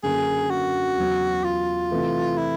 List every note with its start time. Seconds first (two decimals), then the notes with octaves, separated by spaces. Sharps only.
0.03 F#2 D3 F#3 A#3 D4 G#4
0.50 F#4
0.96 E2 C#3 F#3 B3
1.44 F4
1.91 C3 E3 A3
2.38 E4